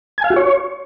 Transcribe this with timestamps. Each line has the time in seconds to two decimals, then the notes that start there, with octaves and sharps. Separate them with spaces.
0.18 G#5
0.24 F5
0.30 F#4
0.36 C#5